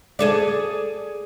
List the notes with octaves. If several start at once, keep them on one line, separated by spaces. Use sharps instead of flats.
G#4 A4 D5